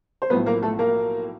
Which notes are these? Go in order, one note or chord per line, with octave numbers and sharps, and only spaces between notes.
C5
B1 A2 F3 B3 B4
A#3 A#4
A3 A4
A#3 A#4